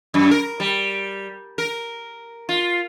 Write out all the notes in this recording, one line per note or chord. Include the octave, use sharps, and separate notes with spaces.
F#2
A#4
G3
A#4
F4